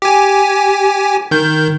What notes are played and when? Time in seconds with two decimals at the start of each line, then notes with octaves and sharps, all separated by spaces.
0.02 G4 G#5
1.31 D#3 G6